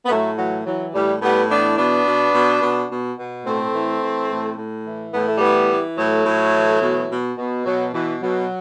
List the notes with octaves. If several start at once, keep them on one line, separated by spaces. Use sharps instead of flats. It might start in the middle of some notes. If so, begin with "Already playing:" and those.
B3
A2 F#3 A3
E3 F#3
E3 F#3
A2 E3 G3
A2 G3 B3
E3 B3 D4
B2 B3 D4
B2
B2
B2
B2
B2
A2 A3 C4
E3
E3
A2
A2
E3
A2 B3
A3
G3 B3
E3
E3
A2 F#3 A3
A2
E3
B2
B2
B2
B2 F#3
B2 E3
B2 F#3